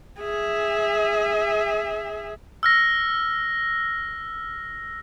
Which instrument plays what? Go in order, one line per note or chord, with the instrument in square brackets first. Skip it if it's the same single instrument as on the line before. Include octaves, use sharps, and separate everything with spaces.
[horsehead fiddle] G#4 E5
[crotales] E6 F6 A#6